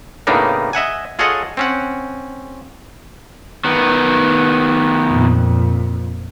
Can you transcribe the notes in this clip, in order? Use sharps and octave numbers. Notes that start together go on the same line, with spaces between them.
A2 C#3 A#3 B3 D4 D#4
D#5 E5 F#5 G#5
F4 G#4 A4 C#5 D#5 F#5
C4 C#4 F#5
D#3 B3
F2 A#2